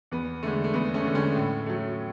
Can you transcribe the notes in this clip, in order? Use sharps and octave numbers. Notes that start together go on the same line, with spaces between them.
E2 B3
D3 G#3 A3
A3
E2 B3
A3 C#4
D3 G#3
A3 C#4
A2
F#3 A3